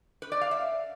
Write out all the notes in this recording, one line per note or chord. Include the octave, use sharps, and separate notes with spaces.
B4
D5
F5
E5